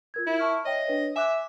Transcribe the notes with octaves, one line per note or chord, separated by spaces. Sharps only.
F4 A#4 G#6
E4
A5 C#6 F6
C#5 D#5 E5 G5
D4 B4 C#5
E5 G#5 D6 F#6